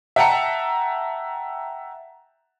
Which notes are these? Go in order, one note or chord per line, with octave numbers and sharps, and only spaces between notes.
E5 F#5 G5 A5 A#5 C#7